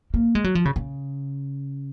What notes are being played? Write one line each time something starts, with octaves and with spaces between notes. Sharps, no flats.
A#3
G#3
F#3
F3
C#3
C#3